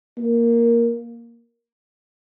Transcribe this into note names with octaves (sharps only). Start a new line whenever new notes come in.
A#3